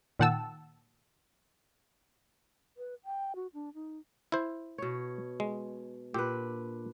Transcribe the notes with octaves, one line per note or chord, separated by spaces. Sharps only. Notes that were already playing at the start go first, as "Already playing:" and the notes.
A#2 D#3 F#5 G5 A5 E6
B4
G5
F#4
D4
D#4
E4 C5
B2 C#5
G#3
A#2 D4 G4 B4